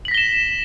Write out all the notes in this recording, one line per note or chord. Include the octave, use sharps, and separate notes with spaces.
A#6 B6 E7 F#7 G7